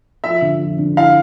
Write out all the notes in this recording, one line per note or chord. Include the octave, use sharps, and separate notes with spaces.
F3 E5
D3
F2
D3
E4 F5